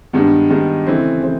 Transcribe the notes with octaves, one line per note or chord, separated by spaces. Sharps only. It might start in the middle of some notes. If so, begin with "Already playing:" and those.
G2 D#3 G#3 B3
G2 D#3 G#3 B3
C#3 E3 A3 C4
C#3 E3 A3 C4